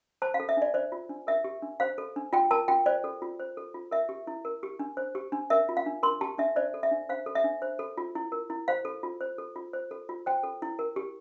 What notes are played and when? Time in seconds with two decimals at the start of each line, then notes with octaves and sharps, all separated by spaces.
0.22 C5 A5
0.34 F5
0.40 A4
0.49 E5
0.57 D4 D5
0.74 C5 D5
0.92 F4
1.09 D4
1.27 A#4 E5
1.44 G4
1.62 D4
1.80 C5 F5
1.98 A4
2.16 D4
2.33 F4 G5
2.51 A#4 A5
2.68 F4 G5
2.86 C5 D5
3.04 A4
3.22 F4
3.40 C5
3.57 A4
3.74 F4
3.91 A#4 E5
4.09 G4
4.27 E4
4.45 A#4
4.63 G4
4.79 D4
4.97 C5
5.15 G4
5.32 D4
5.50 A#4 E5
5.69 F4
5.77 F5
5.86 D4
6.03 A#4 C6
6.21 G4 A5
6.38 D4 E5
6.56 C5 D5
6.74 A4
6.83 E5
6.91 D4
7.09 C5 F5
7.26 A4
7.35 E5
7.44 D4
7.62 C5
7.79 A4
7.98 F4
8.15 E4
8.32 A#4
8.50 E4
8.68 C5 F5
8.85 A4
9.03 F4
9.21 C5
9.38 A4
9.56 F4
9.73 C5
9.91 A4
10.09 F4
10.26 C5 G5
10.43 A4
10.62 E4
10.79 A#4
10.96 G4